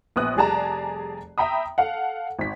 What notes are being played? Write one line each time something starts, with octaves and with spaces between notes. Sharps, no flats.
A#1 B3 D#6 F#6
F1 G3 G#4 D5 A5 A#5
E5 G5 A#5 B5 D#6
A4 F5 F#5
G#1 B6